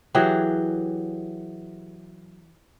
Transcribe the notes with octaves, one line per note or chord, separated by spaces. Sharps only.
E3 F#3 G4 G#4